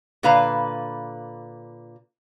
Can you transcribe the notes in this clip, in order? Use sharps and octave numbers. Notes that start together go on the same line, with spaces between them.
A#2 D3 B4 F5 A#5